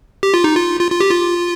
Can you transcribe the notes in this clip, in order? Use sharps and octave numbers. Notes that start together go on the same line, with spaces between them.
G4
F4
D#4
F4
F4
F4
G4
F4